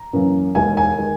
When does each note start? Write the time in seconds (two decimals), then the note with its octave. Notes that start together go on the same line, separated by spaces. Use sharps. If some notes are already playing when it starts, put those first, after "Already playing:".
Already playing: A#5
0.13 F#2 C#3 E3 A#3
0.55 E1 D#2 D#3 G#3 G#5
0.77 G#5
0.98 D#3 G#3